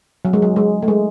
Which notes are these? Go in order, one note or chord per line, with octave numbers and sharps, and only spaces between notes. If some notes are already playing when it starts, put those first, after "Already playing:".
F#3
G#3
F#3
G#3
A3
G#3